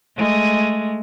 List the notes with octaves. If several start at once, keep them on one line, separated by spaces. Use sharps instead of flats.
G#3 A3